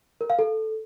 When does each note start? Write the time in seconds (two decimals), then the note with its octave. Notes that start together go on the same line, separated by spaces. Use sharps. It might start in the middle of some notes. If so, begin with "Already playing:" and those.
0.21 A#4
0.30 F5
0.39 A4